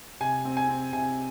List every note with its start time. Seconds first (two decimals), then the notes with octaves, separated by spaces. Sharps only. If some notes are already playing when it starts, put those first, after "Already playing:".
0.20 C3 G#5
0.45 C4
0.57 G#5
0.69 C4
0.93 C3 G#5